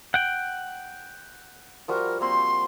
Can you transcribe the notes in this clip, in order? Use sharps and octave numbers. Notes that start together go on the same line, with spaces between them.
F#5 G5
F3 G3 F#4 A#4
A#3 C4 C6